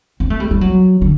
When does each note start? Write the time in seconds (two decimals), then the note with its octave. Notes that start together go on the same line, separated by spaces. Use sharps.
0.20 C4
0.30 A3
0.40 G3
0.51 G3
0.61 F#3
1.01 D3